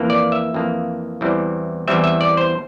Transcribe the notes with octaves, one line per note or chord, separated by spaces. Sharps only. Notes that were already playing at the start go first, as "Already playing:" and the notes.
Already playing: F2 E3 A#3
D5
E5
F2 E3 A#3
E2 E3 G3 C4
E2 E3 G3 C4 E5
E5
D5
C5